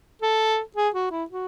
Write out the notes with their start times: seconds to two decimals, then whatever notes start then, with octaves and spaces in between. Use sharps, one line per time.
0.22 A4
0.77 G#4
0.94 F#4
1.11 E4
1.30 F#4